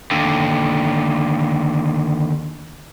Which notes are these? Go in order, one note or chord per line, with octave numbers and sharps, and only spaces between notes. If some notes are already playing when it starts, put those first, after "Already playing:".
D#2 D3